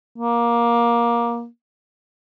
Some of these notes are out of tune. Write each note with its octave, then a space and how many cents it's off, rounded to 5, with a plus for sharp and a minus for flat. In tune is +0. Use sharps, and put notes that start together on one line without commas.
A#3 +15